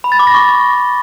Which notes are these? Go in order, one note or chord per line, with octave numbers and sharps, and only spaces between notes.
B5
A6
D6
A#6
C#6